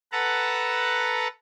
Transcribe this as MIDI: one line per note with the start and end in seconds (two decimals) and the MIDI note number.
0.12 1.28 69
0.12 1.28 71
0.12 1.28 78
0.12 1.28 81
0.12 1.28 82